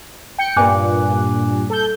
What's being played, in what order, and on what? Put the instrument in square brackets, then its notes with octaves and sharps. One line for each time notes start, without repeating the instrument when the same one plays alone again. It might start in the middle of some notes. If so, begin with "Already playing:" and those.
[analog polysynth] G5 C#7
[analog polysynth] G2 A#2 [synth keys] G#5 D6 F#6
[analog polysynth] A4 G6